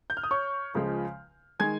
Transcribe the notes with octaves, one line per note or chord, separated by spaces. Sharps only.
G6
F6
D#6
C#5 C#6
C#2 C#3 F3 G#3
D#3 G#3 G#5 G#6